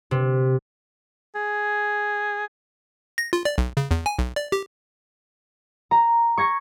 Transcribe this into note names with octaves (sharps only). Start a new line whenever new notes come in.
C3
G#4
A#6
F4
D5
B1
C#3
E2
G#5
B1
D5
G4
A#5
C#6 G#6 A#6 C#7